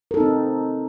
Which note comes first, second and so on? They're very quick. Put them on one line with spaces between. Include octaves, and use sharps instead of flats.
A#4 A4 D#4 C4